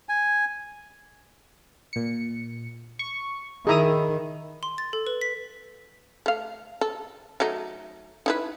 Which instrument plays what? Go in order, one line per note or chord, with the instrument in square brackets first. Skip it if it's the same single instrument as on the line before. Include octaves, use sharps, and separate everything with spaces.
[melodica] G#5
[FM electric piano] A#2 C#7
C#6
[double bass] D#3 [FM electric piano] D#4 E4 [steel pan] G#4 A#5 D#6
[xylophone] C6
A6
A4
B4
B6
[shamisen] A3 F5
A4
F#3 A3 D#4
D#4 E4 B4